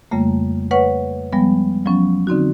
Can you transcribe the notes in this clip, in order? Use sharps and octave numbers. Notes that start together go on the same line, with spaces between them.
F2 C#3 G3 A3 A#3
B4 C#5 F#5 C#6
F3 G3 G#3 B3
F3 F#3 B3 C#4
D3 C4 D#4 F#4